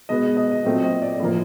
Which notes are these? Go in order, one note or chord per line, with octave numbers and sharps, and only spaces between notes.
B2 G#3 B3 D#5
D#5
D#5
A#2 F#3 A3 C4 D#5
D#5
D5
A2 F3 A#3